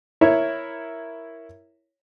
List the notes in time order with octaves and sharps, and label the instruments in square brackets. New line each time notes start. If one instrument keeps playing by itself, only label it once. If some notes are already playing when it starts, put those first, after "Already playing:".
[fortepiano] E4 A#4 C#5 E5